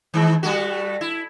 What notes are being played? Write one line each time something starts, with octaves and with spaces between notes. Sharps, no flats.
D#3 G#3
G3 A3 F#4
E4